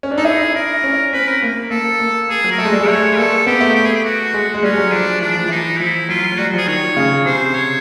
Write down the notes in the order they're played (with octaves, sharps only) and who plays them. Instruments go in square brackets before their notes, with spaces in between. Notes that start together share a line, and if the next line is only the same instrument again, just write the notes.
[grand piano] C#4
D4
[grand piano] D#4 [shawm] A4
[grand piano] E4 [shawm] G#4
[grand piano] D4 [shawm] A#4
[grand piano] C#4
[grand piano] C4 [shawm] B4
[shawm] A#4
[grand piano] A#3
[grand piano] A#3 [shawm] A4
[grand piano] A#3
[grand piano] A#3 [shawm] G#4
[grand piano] F#3
[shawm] A#4
[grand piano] A3 [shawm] A4
[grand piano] G#3
G3
G#3
[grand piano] A3 [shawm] C#5
[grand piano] A#3 [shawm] A4
[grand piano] B3 [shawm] G4
[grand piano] A3
[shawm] G4
G#4
G4
F#4
[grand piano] G#3
G#3
[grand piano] G3 [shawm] C#4
[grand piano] F#3
[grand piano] F3 [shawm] D4
[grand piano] E3 [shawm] D4
[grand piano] F3
[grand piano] E3 [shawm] D#4
[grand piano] F3 [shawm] E4
[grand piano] F#3 [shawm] F4
[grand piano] F#3
[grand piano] G3 [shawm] F#4
[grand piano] F3
[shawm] G#4
[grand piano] D#3 [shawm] C#5
[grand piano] C#3
[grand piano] C3 [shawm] C5
[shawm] C#5